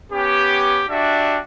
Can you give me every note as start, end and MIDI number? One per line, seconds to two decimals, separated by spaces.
0.13 0.83 59
0.13 0.83 61
0.13 0.83 67
0.89 1.38 62
0.89 1.38 66
0.89 1.38 67
0.89 1.38 74
0.89 1.38 76